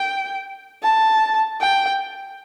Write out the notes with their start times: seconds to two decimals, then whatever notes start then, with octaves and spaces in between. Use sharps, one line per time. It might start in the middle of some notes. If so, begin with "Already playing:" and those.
Already playing: G5
0.83 A5
1.61 G5